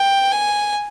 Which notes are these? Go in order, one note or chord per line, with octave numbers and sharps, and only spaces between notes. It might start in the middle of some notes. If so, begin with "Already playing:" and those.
Already playing: G5
G#5